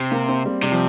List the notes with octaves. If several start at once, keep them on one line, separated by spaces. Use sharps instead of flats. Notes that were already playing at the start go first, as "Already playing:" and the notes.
Already playing: C3 C4
A#3
C4
G3
C3 G3
F3